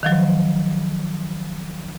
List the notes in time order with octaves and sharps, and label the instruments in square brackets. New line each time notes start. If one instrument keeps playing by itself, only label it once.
[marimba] D#3 F3 F#3